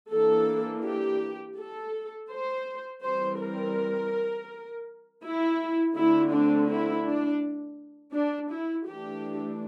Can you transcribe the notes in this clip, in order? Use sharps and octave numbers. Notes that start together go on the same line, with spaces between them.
E3 A#3 D4 A4
G4
A4
C5
E3 G3 C4 C5
A#4
E4
D3 A3 C4 E4
D4
E4
D4
D4
E4
E3 A3 D4 G4